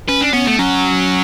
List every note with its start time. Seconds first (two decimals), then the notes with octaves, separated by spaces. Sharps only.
0.09 C#4 B4
0.21 D4
0.33 B3 C#4
0.47 A3
0.59 F#3 C#4